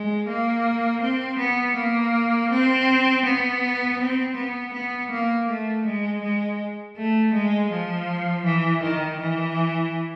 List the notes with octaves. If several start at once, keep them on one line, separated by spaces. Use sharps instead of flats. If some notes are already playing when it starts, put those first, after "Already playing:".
Already playing: G#3
A#3
C4
B3
A#3
C4
B3
C4
B3
B3
A#3
A3
G#3
G#3
A3
G#3
F3
E3
D#3
E3